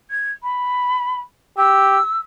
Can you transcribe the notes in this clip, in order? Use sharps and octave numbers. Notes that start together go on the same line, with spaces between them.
G#6
B5
G4 E6